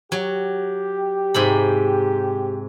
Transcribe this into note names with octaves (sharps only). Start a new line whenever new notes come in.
F#3 G4
G#2 C3 B5